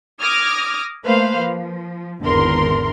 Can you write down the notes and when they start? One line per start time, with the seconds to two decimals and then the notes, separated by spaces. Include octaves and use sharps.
0.20 D6 D#6 F6 G#6 A#6
1.05 A3 A#3 B4 C5 F5
1.39 F3
2.22 G#1 E2 D3 A#4 C6